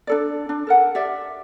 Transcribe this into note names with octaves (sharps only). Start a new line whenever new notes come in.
D4 A4 D5
D4
A4 A#4 F#5
G4 D5 E5